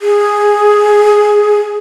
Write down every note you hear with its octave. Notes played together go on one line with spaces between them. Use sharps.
G#4